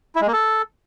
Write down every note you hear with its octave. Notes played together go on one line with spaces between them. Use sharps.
E4
G#3
A#3
A4